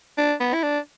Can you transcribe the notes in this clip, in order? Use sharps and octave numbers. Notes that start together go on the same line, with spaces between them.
D4
B3
E4
D4